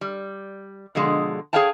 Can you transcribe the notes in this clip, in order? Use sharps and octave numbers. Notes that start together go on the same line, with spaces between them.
G3
B2 D3 F3 G#3
G#4 C5 C#5 F5 G5 A5